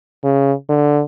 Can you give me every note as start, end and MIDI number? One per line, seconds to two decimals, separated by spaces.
0.23 0.52 49
0.69 1.01 50